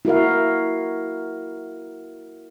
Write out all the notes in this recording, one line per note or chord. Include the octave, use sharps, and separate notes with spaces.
E4 F#4 A#4 F5